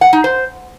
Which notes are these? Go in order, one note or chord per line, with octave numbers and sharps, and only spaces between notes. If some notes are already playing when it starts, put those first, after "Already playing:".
F#5
D#4
C5